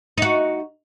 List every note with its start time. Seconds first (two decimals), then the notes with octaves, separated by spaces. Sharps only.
0.18 D#4 F#4